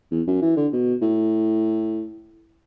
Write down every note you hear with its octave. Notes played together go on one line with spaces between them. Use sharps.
E2
F#2
E3
D3
B2
A2